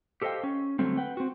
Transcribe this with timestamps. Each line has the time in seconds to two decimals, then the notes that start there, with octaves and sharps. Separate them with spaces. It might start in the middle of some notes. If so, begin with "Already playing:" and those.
0.22 G4 A4 C5 D#5 F5 G5
0.43 C#4
0.79 D3 F#3 G3 A3 C4
0.97 B4 F#5 G5
1.17 C4 F#4